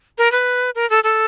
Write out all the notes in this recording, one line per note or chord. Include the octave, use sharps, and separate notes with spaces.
A#4
B4
A#4
A4
A4